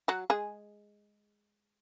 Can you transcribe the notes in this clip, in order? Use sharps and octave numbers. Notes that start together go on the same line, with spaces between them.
F#3 F#4
G#3 G#4